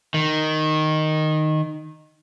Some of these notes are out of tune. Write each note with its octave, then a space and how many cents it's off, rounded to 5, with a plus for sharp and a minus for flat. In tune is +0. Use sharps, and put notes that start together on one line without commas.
D#3 -5